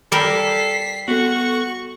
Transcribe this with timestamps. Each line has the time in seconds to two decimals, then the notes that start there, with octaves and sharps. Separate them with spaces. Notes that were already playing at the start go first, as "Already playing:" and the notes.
0.12 G3 A4 A#4 B6 C7
1.08 B3 F#4 A4 C#6